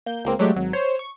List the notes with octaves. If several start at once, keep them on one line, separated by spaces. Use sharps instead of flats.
A#3 G6
C#2 A#3 C4
F#3 G#3 A3 D4 G4
G#1 F#3
C5 C#5
C#6